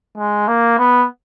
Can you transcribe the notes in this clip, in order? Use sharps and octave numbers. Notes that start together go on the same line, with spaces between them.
G#3
A#3
B3